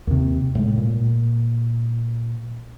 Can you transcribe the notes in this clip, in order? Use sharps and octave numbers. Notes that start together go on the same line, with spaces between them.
D#2 C3
A2 G#3
A#2